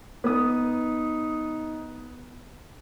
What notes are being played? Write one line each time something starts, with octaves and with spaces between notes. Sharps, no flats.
B3 D#4 D#6